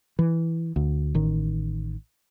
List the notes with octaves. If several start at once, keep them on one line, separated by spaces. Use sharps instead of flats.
E3
D2
A1 D#3